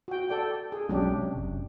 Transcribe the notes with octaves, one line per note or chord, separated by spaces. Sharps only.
F#4 G5
A4 D5 G5
G#4
B1 F#3 G#3 C#4 D4 G4
C3
F#1